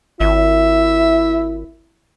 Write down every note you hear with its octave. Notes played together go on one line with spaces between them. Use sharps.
G#1 E4 E5